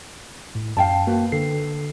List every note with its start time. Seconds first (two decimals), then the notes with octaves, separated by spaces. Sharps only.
0.55 A2
0.77 F#2 F5 G5 A5
1.07 A#3 F#4 B4 G5
1.32 D3 A4 C7